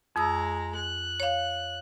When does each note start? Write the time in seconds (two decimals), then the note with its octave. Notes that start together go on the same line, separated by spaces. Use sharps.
0.16 F2 G#3 A#5 D#6 E6
0.75 F#6
1.20 C#5 F5